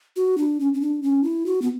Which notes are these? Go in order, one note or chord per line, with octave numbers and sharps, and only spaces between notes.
F#4
D4
C#4
C#4
D4
C#4
E4
F#4
B3